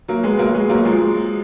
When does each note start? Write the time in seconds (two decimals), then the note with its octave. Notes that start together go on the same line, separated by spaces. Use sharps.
0.08 F#3 A#3
0.23 G#3 B3
0.39 F#3 A#3
0.54 G#3 B3
0.69 F#3 A#3
0.85 F3 G#3